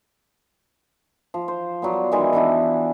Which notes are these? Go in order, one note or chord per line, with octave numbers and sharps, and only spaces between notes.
F3
C5
F#3 G3 B3
D#3 E3 G#3 E4
E3 B3 D4 E4